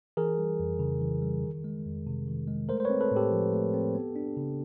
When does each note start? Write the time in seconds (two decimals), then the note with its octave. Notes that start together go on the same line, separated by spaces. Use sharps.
0.17 E3 G#4 A#4
0.38 G3
0.60 F2
0.79 C#3
1.01 E3
1.22 G3
1.44 D#3
1.64 G#3
1.86 F2
2.07 C3
2.28 D#3
2.48 G#3
2.69 A3 A#4 C5
2.80 C5
2.85 C4 B4 C#5
3.01 A4 B4
3.11 A2
3.16 G4 A4
3.32 F3
3.53 A3
3.74 C4
3.95 B3
4.16 D4
4.37 C#3